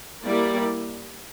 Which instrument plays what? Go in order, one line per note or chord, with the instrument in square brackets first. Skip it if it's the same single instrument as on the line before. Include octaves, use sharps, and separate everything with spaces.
[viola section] G3 A#3 E4 A#4 D5